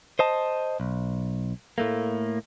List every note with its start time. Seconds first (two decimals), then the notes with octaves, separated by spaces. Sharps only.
0.19 C5 D#5 A5
0.80 B1
1.78 A2 A3 A#3